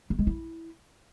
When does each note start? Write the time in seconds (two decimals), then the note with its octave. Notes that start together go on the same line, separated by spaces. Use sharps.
0.10 A3
0.19 G#3
0.27 E4